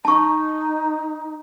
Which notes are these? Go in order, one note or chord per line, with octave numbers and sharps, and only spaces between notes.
D#4 A5 C#6